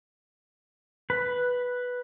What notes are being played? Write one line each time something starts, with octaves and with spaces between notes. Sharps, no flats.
B4